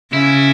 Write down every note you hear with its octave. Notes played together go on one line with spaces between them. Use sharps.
C#3 E4